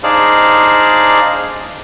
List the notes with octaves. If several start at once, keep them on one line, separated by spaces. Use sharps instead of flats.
D4 D#4 G#4 C5 D5 F5